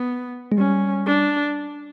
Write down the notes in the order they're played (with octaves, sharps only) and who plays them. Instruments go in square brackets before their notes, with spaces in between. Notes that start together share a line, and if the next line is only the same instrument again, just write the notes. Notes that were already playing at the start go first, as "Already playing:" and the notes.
Already playing: [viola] B3
[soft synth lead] G#3
[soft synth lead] G3 [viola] C#4
[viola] D4